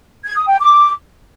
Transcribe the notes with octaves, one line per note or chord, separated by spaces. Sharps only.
G#6
D#6
G5
D6